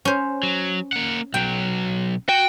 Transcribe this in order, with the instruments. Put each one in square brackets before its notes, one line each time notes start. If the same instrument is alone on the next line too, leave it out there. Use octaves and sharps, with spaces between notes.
[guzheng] C#4 C5
[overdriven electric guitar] F#3
A#3 F#5
[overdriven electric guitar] B1 F#3 [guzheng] G5
[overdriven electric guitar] F#4 [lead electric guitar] G5